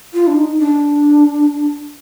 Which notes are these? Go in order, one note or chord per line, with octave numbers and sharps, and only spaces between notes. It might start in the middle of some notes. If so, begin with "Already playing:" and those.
F4
D4
D#4
D4